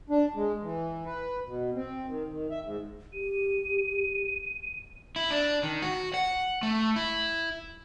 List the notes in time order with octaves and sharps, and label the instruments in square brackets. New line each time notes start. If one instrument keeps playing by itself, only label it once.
[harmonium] D4
G#3
E3
B4
B2
C4
D#3
D#3
E5
G#2
[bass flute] G4 [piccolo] D#7
[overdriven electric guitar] E4
D4
D#3
F#4
F#5
A3
E4